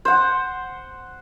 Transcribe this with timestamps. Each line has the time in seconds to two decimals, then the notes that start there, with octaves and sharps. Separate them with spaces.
0.05 C5 F#5